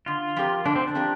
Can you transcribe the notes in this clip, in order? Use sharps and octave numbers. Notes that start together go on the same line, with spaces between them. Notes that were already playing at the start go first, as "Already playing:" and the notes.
D3 F4
F3 C4 G4 A#4
D3 D4
C4
D4
F3 C4 G4 A#4